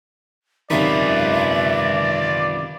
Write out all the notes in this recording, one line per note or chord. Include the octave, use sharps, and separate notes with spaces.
F#2 C3 D#3 F4 B4 D5 E5